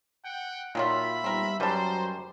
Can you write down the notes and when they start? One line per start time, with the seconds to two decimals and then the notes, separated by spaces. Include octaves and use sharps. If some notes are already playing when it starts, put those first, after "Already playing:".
0.24 F#5 G5
0.75 A#2 D#3 F#3 F4 E5 B5
1.24 G3 B3 C4 D#4 A#4
1.60 F#2 F#3 G3 B4 C5 A5 A#5